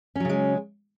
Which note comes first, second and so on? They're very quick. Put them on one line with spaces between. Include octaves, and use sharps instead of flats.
C#4 F#3 C#3 G#3